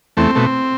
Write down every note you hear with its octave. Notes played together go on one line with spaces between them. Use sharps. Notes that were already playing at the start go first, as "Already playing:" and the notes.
E2 A3 C4
B2 A3